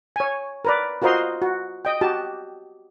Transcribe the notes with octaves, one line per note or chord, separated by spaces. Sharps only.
C#5 G#5
A#4 B4 D5
F4 F#4 A#4 C5 D#5 C6
F#4
D#5 G5
F#4 G4 A5